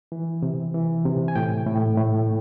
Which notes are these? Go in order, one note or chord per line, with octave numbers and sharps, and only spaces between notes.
E3
C3
E3
C3
G#5
A2 G5
A2
A2